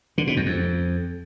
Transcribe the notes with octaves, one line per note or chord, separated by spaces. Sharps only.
D3
B2
F#2
F2